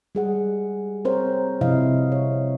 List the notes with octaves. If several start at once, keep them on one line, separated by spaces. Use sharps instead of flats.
G3 G#4 F#5
C4 A#4 C5 C#5
C3 F3 E4 D#5 F5
C#5